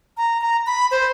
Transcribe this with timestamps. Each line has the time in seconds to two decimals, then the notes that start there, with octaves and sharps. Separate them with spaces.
0.17 A#5
0.41 A#5
0.67 B5
0.91 C5